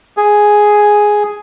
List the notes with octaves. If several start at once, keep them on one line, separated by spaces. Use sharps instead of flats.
G#4